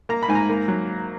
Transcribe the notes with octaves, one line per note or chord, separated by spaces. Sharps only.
A#3 A#5
B5
G#2 G#5
A#5
A#3
F#3